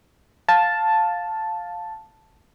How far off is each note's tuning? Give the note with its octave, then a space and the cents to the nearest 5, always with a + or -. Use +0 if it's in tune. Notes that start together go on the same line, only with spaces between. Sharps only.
F5 +10 A5 +0